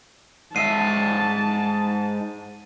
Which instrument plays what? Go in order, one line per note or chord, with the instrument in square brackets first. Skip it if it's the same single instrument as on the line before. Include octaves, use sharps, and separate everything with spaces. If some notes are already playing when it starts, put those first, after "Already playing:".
[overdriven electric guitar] G#2 E5 [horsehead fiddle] A5 [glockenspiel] C7 D#7